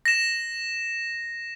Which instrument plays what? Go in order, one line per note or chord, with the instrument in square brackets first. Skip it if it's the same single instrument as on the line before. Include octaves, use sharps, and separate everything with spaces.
[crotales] A#6 E7